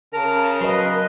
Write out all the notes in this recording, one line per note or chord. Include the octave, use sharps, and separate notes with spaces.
C#3 A#4 A5 A#5
F#3 A#4 B4 D#5 C6